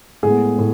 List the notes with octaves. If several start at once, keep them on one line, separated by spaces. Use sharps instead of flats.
A2 G#3 B3 G#4
A2